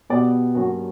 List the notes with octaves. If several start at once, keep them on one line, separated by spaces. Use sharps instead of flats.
B2 G3 B3 D5
G2 F#3 A#3 C#4 F#4